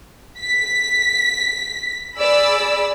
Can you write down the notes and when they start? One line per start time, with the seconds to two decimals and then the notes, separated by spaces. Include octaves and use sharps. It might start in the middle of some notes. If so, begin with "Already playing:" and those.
0.41 B6
2.17 G#4 D5 B5 E6